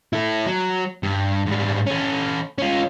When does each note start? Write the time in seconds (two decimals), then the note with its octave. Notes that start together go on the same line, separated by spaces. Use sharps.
0.13 E4 A4
0.47 F#3
1.03 G2
1.46 G#2 G3
1.86 C#4 A4
2.58 C#4 F4